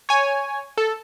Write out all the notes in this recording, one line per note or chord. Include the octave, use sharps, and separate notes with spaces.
C#5 G#5
A4